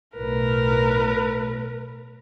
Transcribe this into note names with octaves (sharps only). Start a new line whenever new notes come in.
B1 A2 A#4 B4